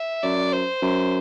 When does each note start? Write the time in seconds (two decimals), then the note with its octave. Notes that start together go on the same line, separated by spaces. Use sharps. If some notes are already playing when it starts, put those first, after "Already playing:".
Already playing: E5
0.23 F#2 D5
0.53 C5
0.82 F#2